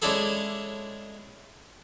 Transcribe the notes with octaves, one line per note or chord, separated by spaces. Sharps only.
G#3 C#4 D4 E4 G#4 A4